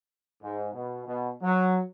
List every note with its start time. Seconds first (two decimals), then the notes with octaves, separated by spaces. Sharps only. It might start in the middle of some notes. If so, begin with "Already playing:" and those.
0.42 G#2
0.73 B2
1.06 B2
1.41 F#3